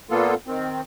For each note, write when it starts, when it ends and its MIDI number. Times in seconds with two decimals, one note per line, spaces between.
0.11 0.34 46
0.11 0.34 58
0.11 0.34 59
0.11 0.34 65
0.11 0.34 69
0.47 0.81 51
0.47 0.81 60